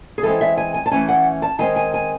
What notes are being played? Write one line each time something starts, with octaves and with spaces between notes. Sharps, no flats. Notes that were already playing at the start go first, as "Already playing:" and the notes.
G#4
E3 G#3 C4 A4
E5
G#5
G#5
A5
E3 A3 C#4 G#5
F#5
A5
D#3 G#3 C4 G#5
G#5
G#5